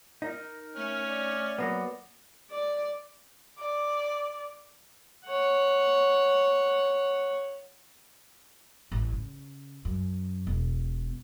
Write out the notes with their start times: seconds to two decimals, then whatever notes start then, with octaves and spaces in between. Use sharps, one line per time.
0.22 D#4 A#4
0.77 A3 C#4 F6
1.07 D5
1.59 F#3 A#3 B3
2.51 D5
3.59 D5
5.27 C#5 F#5
8.92 A1
9.13 C#3
9.85 F#2
10.47 E1